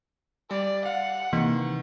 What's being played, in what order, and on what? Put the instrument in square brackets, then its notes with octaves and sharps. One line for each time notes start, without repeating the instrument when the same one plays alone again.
[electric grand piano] G3 [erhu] D5
[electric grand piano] F5 [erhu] F#5
[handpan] C3 E3 [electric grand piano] D#3 [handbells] A#3